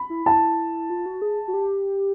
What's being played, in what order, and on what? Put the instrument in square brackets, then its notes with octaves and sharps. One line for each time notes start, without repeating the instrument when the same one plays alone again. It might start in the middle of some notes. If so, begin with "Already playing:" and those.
Already playing: [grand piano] B5
[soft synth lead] E4
[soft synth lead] E4 [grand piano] A5
[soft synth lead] F4
F#4
G#4
F#4
G4